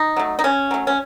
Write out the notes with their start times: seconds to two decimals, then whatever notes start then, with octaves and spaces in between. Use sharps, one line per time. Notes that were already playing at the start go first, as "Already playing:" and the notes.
Already playing: D#4
0.17 F#3 A3
0.39 D#4
0.44 C#3 C#4
0.71 F#3 A3
0.87 C#4